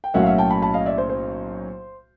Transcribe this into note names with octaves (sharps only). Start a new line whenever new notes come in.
G5
B1 A2 F#3 A#3 C#4 E5 F#5
F5
E5 F#5
G5 A5
A5 B5
A5 B5
D#5 F5
D5 E5
C5
C5